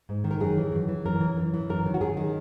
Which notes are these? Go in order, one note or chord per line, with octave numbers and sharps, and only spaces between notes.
G#2
D#3
A#4
F#2 G#4
E3
F#2
E3
F#2 A#4
E3
F#2
E3
F#2 A#4
D#3
F#4
F#2 G#4
D#3